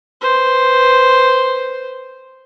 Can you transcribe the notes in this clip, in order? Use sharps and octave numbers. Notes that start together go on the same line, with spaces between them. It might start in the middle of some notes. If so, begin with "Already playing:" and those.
B4 C5